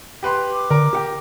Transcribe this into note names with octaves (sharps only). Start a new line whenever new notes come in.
G4 B4 C6
D6
D3 A#4
G4 F#5 G5